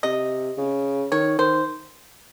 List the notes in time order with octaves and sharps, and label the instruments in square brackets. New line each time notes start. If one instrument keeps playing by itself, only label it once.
[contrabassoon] C3 [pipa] D#5
[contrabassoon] C#3
[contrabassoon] D#3 [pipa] C#5
[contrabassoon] D#3 [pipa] C5